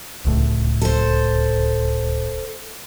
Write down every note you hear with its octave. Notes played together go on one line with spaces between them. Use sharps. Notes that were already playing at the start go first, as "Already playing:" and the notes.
D1 C#2 A2
A4 C5